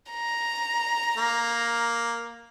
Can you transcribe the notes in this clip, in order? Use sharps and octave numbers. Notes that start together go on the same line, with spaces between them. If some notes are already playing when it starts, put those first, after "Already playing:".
A#5
A#3